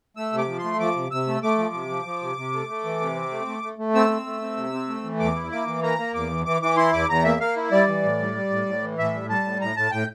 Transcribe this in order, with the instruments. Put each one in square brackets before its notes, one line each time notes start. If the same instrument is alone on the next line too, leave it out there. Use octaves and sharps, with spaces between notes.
[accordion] A3 E6
C3
D6
F3
C6
A3
F3 D6
C3
C3 E6
A3
A3 D6
F3
C3
F3
F3
C3
C3
A3
A3
E3
C3
C4
A3
A3
A3
A3
C4 E6
C4
A3
C4
C3
C4
A3
E3
E2 D6
E4
A#3 D6
E3
A#3 A#5
A#3
E2 D6
E3
E3 D6
E3 D6
E4 C6
E2 D6
E2 A#5
A#3 E5
A#3 F5
E4
G3 D5
E3
A2
G3
G3
A2
A2
E3
A2 E5
G3
G3 A5
A2
A2 A#5
A2 A5
A2 G5